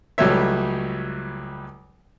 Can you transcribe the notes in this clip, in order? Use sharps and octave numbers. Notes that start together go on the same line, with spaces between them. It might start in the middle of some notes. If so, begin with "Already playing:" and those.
C#2 F#3 G3 A3 C#5 E5